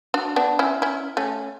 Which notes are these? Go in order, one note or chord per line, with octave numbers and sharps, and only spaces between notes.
D4 F#4
B3 D4
C#4 E4
C#4 E4
A3 C#4